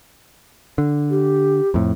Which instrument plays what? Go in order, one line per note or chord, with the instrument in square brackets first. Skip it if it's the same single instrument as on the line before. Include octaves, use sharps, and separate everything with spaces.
[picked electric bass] D3
[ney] G4
[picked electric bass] F2 A2